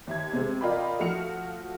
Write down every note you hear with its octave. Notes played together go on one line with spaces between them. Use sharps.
D#2 E5 G#6
C3 G#3 C4
F4 A#4 D5 D#5 G5 B5
F3 A3 F#4 F6 C#7 F7